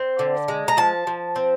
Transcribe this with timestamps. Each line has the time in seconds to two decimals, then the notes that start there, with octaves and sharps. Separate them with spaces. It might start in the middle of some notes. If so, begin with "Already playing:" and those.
Already playing: C4
0.19 D3
0.48 G#3
0.68 A#5
0.77 F3 A5
1.07 F3
1.36 C4